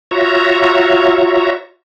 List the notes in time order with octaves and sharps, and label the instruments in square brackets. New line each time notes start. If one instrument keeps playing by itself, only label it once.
[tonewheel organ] F4 F#4 C#5 E5 A#5